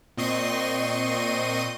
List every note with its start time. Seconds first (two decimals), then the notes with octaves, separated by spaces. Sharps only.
0.17 A#2 C4 D#5 C#6 C7 D#7